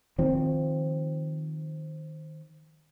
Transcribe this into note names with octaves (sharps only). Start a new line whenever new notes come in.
D#3 F3 C4